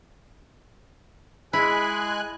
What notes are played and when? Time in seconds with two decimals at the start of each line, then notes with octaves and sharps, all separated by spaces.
1.53 G#3 E4 G#4 G#5 F#6